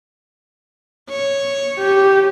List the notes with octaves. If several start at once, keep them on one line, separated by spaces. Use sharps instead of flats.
C#5
G4